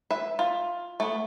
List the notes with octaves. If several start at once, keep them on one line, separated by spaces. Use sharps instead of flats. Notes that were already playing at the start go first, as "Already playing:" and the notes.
B4 E5
F4
A3 B3